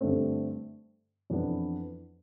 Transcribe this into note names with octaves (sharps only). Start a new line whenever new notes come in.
G2 D3 A3 C4
F2 E3 B3 D4